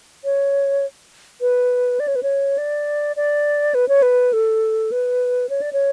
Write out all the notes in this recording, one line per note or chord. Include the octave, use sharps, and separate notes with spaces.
C#5
B4
D5
C#5
B4
C#5
D5
D5
B4
C#5
B4
A4
B4
C#5
D5
C#5